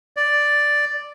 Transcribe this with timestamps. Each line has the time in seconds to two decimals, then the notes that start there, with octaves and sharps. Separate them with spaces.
0.17 D5